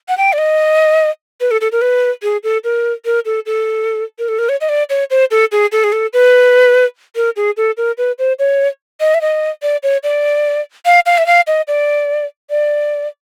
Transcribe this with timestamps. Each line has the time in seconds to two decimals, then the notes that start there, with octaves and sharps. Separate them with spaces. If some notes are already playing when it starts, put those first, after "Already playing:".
0.09 F#5
0.18 G5
0.33 D5
0.38 D#5
1.41 B4
1.51 A4
1.61 A4
1.72 A#4
1.82 B4
2.23 G#4
2.44 A4
2.64 A#4
3.05 A#4
3.25 A4
3.46 A4
4.19 A#4
4.29 A4
4.39 A#4
4.49 C#5
4.61 D#5
4.69 D5
4.90 C#5
5.10 C5
5.31 A4
5.52 G#4
5.72 A4
5.84 G#4
5.92 A4
6.13 B4
7.16 A#4
7.36 G#4
7.57 A4
7.77 A#4
7.98 B4
8.19 C5
8.39 C#5
9.00 D#5
9.14 E5
9.21 D#5
9.62 D5
9.83 C#5
10.03 D5
10.86 F5
11.06 F5
11.18 E5
11.27 F5
11.47 D#5
11.68 D5
12.50 D5